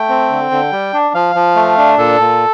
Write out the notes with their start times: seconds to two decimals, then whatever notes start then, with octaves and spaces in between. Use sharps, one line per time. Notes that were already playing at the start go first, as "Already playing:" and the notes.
Already playing: A3 G5
0.09 C4
0.30 D3
0.51 D3
0.72 G3
0.93 D4
1.14 F3 F5
1.35 F3
1.56 A3
1.78 D4
1.98 A#2 A4
2.20 A#2